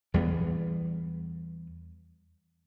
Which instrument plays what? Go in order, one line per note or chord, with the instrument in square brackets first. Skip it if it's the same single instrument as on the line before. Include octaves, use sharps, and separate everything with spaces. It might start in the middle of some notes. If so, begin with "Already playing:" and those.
[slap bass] E2 G3 A3 B3